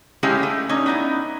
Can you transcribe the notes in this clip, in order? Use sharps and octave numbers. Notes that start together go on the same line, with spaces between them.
G#3 A3 C#4 E4 G4 F5
A3
C#4 D#4
B3 D#4 E4